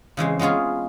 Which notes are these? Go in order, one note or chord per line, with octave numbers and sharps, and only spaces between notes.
C#3 E3 G#3 C4
G#3 B3 C#4 F4 G#4